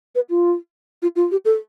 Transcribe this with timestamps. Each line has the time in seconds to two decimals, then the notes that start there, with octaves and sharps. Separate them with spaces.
0.15 B4
0.30 F4
1.02 F4
1.16 F4
1.31 G4
1.45 A4